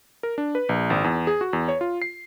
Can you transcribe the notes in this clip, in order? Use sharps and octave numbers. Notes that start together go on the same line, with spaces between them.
A#4
D4
B4
A#1
G#1
E2
G#4
F#4
E2
C#5
F4
C7